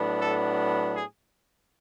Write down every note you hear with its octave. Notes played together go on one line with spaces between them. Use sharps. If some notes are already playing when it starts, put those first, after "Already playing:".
Already playing: A2 F#3 B3 D4
A4
G#4